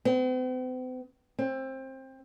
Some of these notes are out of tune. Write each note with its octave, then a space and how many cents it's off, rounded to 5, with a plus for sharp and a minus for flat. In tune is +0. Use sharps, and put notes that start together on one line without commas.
C4 -45
C4 +20